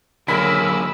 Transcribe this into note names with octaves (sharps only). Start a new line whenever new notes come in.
D3 F#3 A#3 G#4 A#4 B5 E6